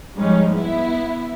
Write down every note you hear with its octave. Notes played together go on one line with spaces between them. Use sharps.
G#2 F3 G3 G#3 C#4 D#4
B3 E4